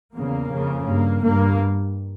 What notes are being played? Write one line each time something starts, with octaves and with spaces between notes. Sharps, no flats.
E2 C#3 A#3
F2 C#3
G2 A#3
G2 A#3